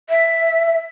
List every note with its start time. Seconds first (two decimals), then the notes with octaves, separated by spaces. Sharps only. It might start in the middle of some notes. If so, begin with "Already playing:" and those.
0.10 E5